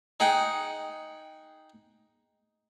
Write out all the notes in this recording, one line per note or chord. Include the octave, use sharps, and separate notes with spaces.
D#4 G#4 F#5 G5